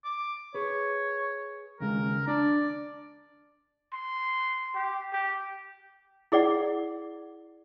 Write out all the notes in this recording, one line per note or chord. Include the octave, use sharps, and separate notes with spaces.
D6
G#4 B4 C#5
D#2 C#3 G#3 A#4
D4 D5 A5
C6
G4
G4
E4 G#4 D5 F#5